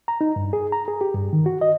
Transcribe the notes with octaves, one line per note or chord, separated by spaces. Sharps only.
A#5
D#4
G2
G#4
A#5
G#4
G4
G2
D#3
F#4
D#5